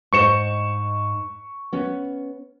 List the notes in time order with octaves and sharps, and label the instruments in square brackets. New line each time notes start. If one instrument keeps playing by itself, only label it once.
[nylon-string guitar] G#2 C5 D#5 [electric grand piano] C#6 C#7 E7
[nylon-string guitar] B3 C#4